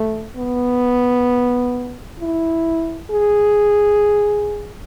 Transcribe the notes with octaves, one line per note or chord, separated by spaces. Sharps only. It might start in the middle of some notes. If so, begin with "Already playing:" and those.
Already playing: A3
B3
E4
G#4